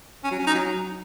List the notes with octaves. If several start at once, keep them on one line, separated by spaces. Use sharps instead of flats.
C#4
F#3
C#4
D#4
F#3